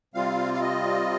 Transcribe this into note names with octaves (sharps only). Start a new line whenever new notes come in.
C3 G3 C4 F4 F5
F5
D#5